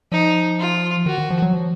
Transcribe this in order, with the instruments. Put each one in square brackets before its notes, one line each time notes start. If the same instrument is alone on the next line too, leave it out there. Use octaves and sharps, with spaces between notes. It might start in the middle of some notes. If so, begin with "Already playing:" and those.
[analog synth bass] F3 [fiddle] D#4
[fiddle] F4
[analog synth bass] D#3 [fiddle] F#4
[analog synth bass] D#3
F3
F#3
F3